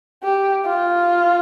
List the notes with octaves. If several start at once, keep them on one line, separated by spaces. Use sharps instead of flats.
G4
F4